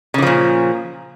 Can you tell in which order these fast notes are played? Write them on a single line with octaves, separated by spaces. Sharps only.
C#3 E3 F3 A#2